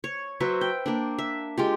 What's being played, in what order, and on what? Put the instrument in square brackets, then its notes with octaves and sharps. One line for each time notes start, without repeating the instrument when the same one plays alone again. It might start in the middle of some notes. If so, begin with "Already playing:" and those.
[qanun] C#5
F#3 B4 C5 E5
G5
A#3 D4
E5
G#3 F4 G4